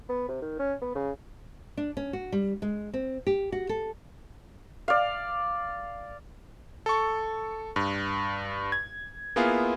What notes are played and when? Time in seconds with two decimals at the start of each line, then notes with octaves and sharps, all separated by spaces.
0.09 B3
0.29 C3
0.42 D#3
0.59 C#4
0.81 B3
0.95 C#3
1.77 D4
1.97 C#4
2.13 F#4
2.32 G3
2.62 G#3
2.94 C4
3.27 G4
3.52 F#4
3.69 A4
4.88 D5 F5
6.86 A4 C#6
7.76 G2
8.72 G#6
9.36 A#3 B3 E4 F4 G#4